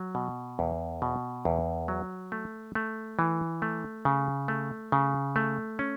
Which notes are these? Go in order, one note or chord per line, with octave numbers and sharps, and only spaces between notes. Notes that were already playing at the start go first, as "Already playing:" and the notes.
Already playing: F#3
B2
E2
B2
E2
F#3
A3
A3
E3
A3
C#3
A3
C#3
A3
C#4